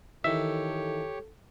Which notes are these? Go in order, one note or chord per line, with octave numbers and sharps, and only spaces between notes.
D#3 E3 G4 A4 C#5 E5